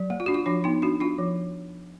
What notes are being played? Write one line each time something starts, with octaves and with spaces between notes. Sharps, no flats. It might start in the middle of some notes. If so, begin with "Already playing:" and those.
Already playing: F#3
A#3
F4
D4 F#4
F4
F3 D4
B3 D#4
D4 F#4
D4 F4
F3